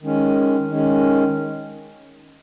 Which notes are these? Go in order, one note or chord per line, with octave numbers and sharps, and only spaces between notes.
D#3 G#3 C#4
D#3 G#3 C#4